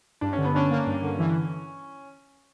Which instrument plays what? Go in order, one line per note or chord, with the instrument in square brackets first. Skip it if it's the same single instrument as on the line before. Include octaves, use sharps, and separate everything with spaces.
[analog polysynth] G2 [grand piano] D4
[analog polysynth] D3 [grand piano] C#4
[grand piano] B3
[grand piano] C#4 [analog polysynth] D4
[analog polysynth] A#3
G2
D3
E3